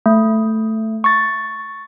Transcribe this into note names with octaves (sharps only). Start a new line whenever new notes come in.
A3
C#6 A6